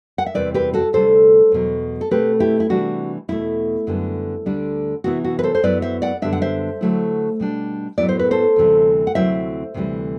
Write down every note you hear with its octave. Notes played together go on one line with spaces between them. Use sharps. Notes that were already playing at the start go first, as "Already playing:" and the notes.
F#5
E5
E2 C3 G3 C4 E4 B4 D5
G4 B4
F#4 A4
D2 C3 G3 D4 A4 C5
E2 B2 F#3
A4
B2 A3 C4 G4 B4
E4 G4
E4
C3 E3 G3 D4 F#4
E2 B2 A3 E4
F#2 D3 G3 B3
D2 D3 G3 D4
C3 E3 B3 E4 F#4
F#4
B4
A4 C5
C5
F#2 F#3 B3 E4 B4 D5
C5 E5
D5 F#5
F#2 D3 G3 B3 D4 E5
F#5
C5 E5
D3 F#3 A3 E4
B2 G3 D4
A2 F#3 B3 E4 D5
C5
B4
A4 C5
D2 C3 E3 G3
F#5
D2 C3 F#3 C4 E4 C5 E5
D2 C3 E3 G3